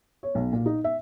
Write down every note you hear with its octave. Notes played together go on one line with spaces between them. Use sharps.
C#5
B1
A#2
D#4
E5